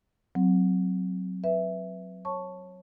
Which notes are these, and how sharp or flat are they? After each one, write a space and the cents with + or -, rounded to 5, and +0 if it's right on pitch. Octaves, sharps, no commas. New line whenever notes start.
F#3 +0 C4 +0
B4 +0 E5 +0
C#5 -20 A5 +0 C#6 +0